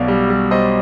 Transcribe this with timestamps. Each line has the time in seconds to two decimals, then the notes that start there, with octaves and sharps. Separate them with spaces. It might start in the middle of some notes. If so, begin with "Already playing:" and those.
Already playing: B1 B2 D5 F5
0.08 G3
0.30 G3
0.51 G3 C5 D#5